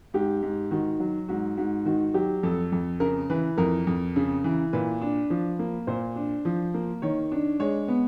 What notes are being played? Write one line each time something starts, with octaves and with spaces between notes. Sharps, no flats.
G#2 G4
G#2
D#3 F#4
F#3
G#2 F#4
G#2 F#4
D#3 F#4
F#3 G4
F2 A4
F2
C#3 A#4
E3 B4
F2 A#4
F2
C#3
E3
A#2 B4
D4
F3
A#3
A#2 C5
D4
F3
A#3
D#3 C#5
D4
G#3 C#5
B3